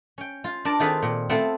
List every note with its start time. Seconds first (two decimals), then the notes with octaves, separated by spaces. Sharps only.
0.18 C#4 G5
0.44 F4
0.65 D4 A#4 D5 A5
0.80 D#3 C4 F4 G#4 A4 B4
1.03 A#2
1.29 A3 B3 C4 F4 F#5